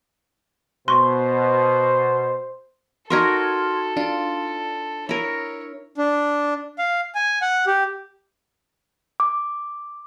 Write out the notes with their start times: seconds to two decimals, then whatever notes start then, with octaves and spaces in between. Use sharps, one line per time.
0.88 B2 C5 C6 C#6
3.10 D#4 F#4 A4 A#4 C6 F6 G#6
3.97 D4 F4
5.09 E4 A#4 C#5
5.98 D4
6.79 F5
7.15 G#5
7.42 F#5
7.67 G4
9.20 D6